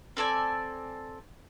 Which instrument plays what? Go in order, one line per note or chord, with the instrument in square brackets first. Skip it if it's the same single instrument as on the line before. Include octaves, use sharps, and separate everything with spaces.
[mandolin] C4 A4 D5 G#5